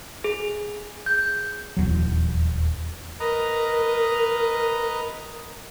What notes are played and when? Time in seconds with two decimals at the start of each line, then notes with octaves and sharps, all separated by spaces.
0.24 G#4
1.06 G6
1.77 D#1 E2 F#3
3.20 A#4 B4 D#5 A#5